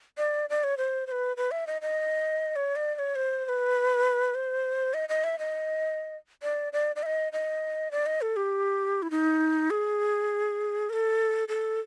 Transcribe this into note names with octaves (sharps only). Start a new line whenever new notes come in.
D5
D5
C#5
C5
C5
B4
B4
E5
D#5
D#5
C#5
D5
D5
C#5
C5
C5
B4
C5
D#5
D#5
E5
D#5
D5
D5
D5
E5
D#5
D#5
D5
D#5
A4
G4
E4
D#4
G#4
A#4
A4
A4